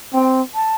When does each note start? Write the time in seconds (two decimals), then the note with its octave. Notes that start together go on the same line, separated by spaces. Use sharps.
0.13 C4 G5
0.54 A5